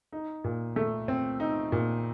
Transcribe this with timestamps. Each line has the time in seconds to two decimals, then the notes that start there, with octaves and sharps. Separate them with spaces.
0.12 D#4
0.44 A#2
0.76 A3
1.08 C4
1.40 D#4
1.72 A#2